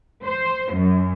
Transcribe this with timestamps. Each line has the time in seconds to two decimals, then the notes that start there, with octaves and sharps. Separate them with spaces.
0.24 C5
0.74 F#2